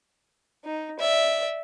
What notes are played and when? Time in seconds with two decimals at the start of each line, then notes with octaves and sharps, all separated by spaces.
0.64 D#4
0.99 D5 E5